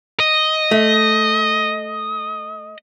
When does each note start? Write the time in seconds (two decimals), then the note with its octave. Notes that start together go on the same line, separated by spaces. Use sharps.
0.20 D#5
0.71 A3